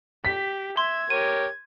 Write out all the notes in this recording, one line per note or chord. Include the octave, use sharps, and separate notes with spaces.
G4 B6
E5 C6 G#6
G4 A#4 C#5 D#7